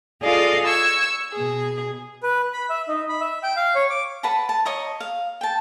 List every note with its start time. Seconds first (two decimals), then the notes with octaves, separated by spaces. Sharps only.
0.21 F4 G#4 A4 D5 D#5 F5
0.65 C#6 E6 G#6
1.32 B2 G#4
2.23 B4
2.53 B5
2.70 E5
2.88 D#4
3.09 B5
3.21 E5
3.43 G5
3.56 F5
3.75 C#5
3.90 D6
4.23 B4 F#5 A5 A#5
4.49 A5
4.65 C#5 D#5 A#5
5.00 F5
5.41 G5 A5